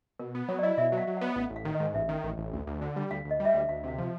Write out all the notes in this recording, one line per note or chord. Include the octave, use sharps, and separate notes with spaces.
B2 A#4
B3
F#3 C#5
D5
E4 D#5
B2 E5
F#3
F5
F#3
B3 F#5
A1 F5
A1
F5
D#3
D#5
G#2
A1 E5
D#3
A1
A1
D2
D2
D3
G3
D2 F5
D2
D#5
G3
E5
D2 F5
D2 F5
C3 F5
F3